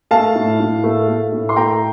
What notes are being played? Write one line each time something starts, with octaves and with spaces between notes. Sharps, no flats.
A3 F5 A5
A2
A2
A3
A3
A2
C6
A3 G5 A#5